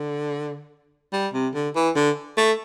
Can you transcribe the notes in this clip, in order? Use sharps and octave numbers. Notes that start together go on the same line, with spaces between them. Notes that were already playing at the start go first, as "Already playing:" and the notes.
Already playing: D3
G3
C3
D3
E3
D3
A3